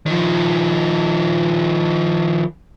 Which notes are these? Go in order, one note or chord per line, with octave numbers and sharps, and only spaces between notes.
D#3 F3